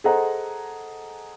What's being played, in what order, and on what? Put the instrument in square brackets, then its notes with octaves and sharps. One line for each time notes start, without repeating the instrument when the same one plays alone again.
[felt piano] G#4 A4 C5 D#5 F#5 A#5